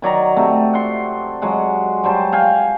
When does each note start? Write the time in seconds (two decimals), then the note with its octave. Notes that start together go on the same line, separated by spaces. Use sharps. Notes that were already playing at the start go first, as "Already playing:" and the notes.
0.02 D#3 F#3 D5 A#5
0.37 C3 A3
0.73 F#5 C6
1.42 F#3 G#3 F#5
2.04 F#3 G3 C5 A5
2.32 F5 G5 G#5